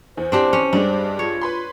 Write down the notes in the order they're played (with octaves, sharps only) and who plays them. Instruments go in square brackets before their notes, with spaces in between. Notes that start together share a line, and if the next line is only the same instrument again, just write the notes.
[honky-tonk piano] E2 [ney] C5
[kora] C4 D4 G4
C#4
[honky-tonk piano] G2 G3 G#3 [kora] D4
[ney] F4 [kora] C#5
[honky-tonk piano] B4 B5 C6